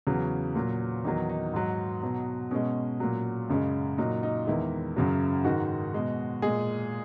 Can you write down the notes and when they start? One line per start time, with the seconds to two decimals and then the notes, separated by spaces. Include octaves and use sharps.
0.07 E2 C#3 F#3 C#4
0.55 A#2 F#3
1.05 E2 D#3 F#3 D#4
1.29 D#4
1.54 G#2 F#3
2.02 B2 F#3
2.51 B2 G#3 C#4
3.00 A#2 F#3
3.49 F#2 C#3 G#3
3.98 A#2 F#3 D#4
4.23 D#4
4.46 E2 D#3 G#3 E4
4.96 F#2 C#3 F#3
5.44 G#2 D#3 G#3 F#4
5.94 B2 G#3
6.42 A#2 G#3 G#4